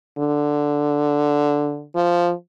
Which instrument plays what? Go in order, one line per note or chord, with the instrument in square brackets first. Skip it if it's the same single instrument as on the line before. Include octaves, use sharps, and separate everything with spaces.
[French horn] D3
F3